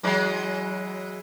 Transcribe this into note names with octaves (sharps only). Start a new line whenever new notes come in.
E3 F#3 G#3